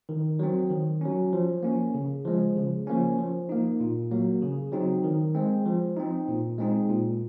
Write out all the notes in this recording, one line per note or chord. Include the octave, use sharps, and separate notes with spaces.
D#3
F#3 C4
D#3
F#3 C#4
F3
A#3 C#4
C#3
F3 G#3
C#3
F3 A#3 C#4
F3
A#3 D#4
A#2
F#3 A#3
C#3
F#3 C4 D#4
D#3
G#3 C4
F3
C4 D#4
A#2
G#3 C4 D#4
A#2